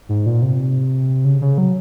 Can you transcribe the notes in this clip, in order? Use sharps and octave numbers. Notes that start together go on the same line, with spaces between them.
G#2
A#2
C3
C#3
C#3
F#3